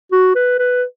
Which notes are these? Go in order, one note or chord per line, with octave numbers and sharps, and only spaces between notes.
F#4
B4
B4